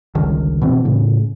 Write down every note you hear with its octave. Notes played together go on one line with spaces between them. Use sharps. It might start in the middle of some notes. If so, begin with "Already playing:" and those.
G1 C#2 D#3
B2 E3 C4
A2 C#3